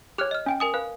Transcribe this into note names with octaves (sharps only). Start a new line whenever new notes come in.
G4 C#5 F6 F#6 F7
D#5 F6
C#4 G5 D7
A#4 G#5 D#6
B4 F5